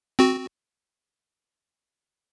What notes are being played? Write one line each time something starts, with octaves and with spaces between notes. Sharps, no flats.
C4 F#4